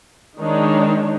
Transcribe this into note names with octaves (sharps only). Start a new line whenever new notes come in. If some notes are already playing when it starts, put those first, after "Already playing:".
D#3 G#3 D4 D#4 C#5